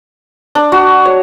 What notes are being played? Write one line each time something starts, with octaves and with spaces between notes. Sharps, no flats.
D4
F#4
C#5